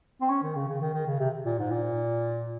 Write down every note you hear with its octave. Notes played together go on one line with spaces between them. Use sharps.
C4
C#4
D#3
C#3
C#3
D#3
D#3
C#3
C3
A#2
G#2
A#2